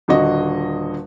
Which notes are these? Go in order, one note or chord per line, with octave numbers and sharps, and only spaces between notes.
D#1 D3 F#4 D#5